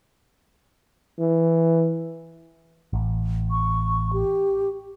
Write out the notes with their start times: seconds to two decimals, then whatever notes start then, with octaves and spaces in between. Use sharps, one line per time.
1.19 E3
2.93 A1
3.51 C#6
4.13 G4